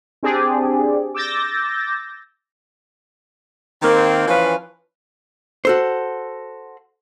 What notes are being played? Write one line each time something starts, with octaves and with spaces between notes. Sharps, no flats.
C4 D4 G4 G#4 D5
D6 E6 G6 A6 A#6
D#3 A#3 C4
E3 F3 C#4 B4 F5 B5
F#4 A4 C5